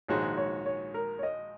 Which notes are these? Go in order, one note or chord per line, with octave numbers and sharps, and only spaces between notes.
A#1 G#2 D#3 G#3 F#4 C#5
C#5
C#5
A#4
C#5
D#5